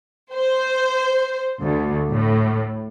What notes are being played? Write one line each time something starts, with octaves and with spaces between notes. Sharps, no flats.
C5
D2
A2